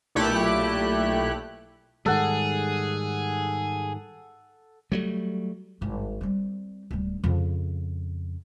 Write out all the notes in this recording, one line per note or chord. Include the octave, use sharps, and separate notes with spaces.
B1 A#2 A3 E4 G4 F#6
G#2 D#3 G3 G#4 A4 F#5
F#3 G3 A3
G#1 G2
G3 C4
D1 G3
F2 C#3